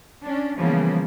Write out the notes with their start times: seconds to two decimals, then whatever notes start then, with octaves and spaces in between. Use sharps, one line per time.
0.23 C#4 D4
0.57 C#3 E3 F3 G3 A#3 B3